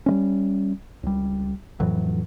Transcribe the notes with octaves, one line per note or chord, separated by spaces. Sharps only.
G3 G#3 C#4
C#2 G3
F2 A2 E3 F#3